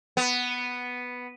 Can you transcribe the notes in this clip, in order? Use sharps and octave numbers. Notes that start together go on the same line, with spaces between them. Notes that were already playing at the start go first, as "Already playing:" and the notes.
B3